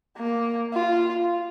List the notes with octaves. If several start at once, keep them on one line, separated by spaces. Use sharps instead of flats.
A#3
F4